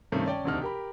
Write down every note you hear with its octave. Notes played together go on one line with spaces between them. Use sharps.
G2 C3 D#3 G3 A3 C#4
C#4 D5 G5 A5
E1 D2 C3 D4 D#4 F6
G4 A#4 B5